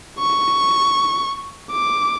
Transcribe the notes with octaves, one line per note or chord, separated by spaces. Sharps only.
C#6
D6